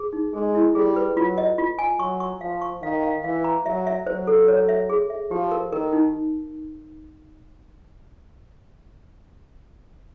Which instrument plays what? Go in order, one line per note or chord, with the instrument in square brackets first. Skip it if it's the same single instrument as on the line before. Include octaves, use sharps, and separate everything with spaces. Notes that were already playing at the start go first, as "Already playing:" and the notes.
Already playing: [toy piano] G#4
D#4
[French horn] G#3 [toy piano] G#4
[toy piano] E4
[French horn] G3 [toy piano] G#4
[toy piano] B4
[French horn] F#3 [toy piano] F4
[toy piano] D#5
F4
G#5
[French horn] F#3 [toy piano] C#6
[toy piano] C#6
[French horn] F3 [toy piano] F5
[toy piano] C#6
[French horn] D#3 [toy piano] F5
[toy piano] F5
[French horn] E3 [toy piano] F5
[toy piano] A#5
[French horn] F#3 [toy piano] E5
[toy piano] E5
[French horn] F#3 [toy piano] C5
[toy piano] A4
C#5
E5
G#4
E5
[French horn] F3 [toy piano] G4
[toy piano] A#4
[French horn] D#3 [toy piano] A#4
[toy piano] D#4